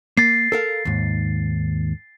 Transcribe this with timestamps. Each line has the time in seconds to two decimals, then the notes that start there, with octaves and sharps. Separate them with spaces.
0.17 A#3 A6 C7
0.52 A4 A#4 F5
0.85 D#2 G#2